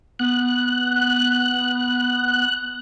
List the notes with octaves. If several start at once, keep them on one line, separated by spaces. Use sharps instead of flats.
B3 F#6